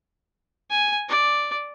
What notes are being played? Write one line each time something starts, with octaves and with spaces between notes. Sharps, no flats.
G#5
D5